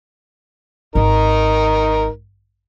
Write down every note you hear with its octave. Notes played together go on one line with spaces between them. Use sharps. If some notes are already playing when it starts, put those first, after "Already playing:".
G#1 D#4 A#4